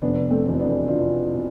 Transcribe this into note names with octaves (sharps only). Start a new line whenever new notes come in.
F1 B3 D4
A3 C4
E2 B2 A3
B3 D4
F1 D4 F4
B2